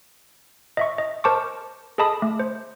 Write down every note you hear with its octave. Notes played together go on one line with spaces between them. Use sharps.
D#5 E5 C#6
D#5
A#4 C5 A5 C#6 D6
G#4 A4 D#5 A5 B5 D#6
A3
C5